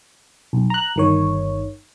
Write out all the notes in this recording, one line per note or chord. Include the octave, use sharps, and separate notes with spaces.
B1
A#5 F#6
G1 D#3 C#5